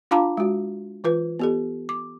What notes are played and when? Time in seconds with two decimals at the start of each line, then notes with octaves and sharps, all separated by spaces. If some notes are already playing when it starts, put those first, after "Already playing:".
0.11 D4 F4 F5 A5 A#5 D6
0.37 G#3 F#4
1.04 E3 F4 B4
1.39 B3 G4 A4
1.89 D6